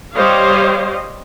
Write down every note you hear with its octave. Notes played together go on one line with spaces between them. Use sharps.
G3 G4 C5 C#5 D#5 F5